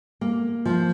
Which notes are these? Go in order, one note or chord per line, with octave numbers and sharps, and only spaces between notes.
A#3
F3